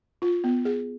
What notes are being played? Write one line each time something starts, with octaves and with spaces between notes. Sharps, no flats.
F4
B3
G#4